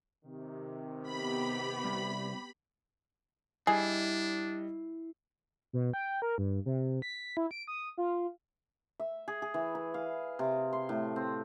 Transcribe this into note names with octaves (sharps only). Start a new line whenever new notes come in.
C3 D#3
B3 G4 B5
C2
G3 D4 E4 G#4 D#5 C7
B2
G5
A#4
G2
C3
B6
E4
D7
D#6
F4
E5
G#4
G#4
E3
B5
F5
C3
C6
A2
C4